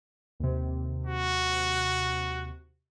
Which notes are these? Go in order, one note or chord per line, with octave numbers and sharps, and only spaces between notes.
D#2 C3
F#4